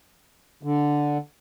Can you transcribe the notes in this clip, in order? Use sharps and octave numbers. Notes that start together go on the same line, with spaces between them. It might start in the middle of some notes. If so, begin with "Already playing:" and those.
D3